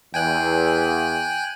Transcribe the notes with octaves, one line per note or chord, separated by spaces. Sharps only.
E2 G5 G#5 F#6